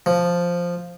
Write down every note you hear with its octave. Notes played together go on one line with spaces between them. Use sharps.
F3